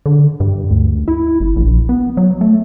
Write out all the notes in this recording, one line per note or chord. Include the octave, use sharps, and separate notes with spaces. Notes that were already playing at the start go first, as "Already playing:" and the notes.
D3
G2
D2
E4
F#1
A#1
B3
F#3
A3